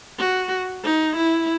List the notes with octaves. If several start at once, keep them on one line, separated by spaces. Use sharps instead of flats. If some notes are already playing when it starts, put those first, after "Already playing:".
F#4
D#4
E4